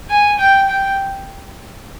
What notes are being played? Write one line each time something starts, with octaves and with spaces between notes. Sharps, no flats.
G#5
G5
G5